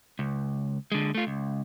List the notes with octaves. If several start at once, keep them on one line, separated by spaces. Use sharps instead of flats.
C#2
D3 G#3
A3 F4
C#2